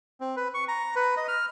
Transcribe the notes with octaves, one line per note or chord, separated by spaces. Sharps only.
C4
B4
C#6
A#5
B4
D#5
F6